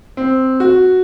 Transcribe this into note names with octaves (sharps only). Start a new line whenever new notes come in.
C4
F#4